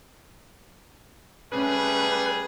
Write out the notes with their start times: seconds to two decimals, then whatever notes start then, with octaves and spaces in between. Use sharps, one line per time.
1.52 G3 A3 C#4 G#4 B4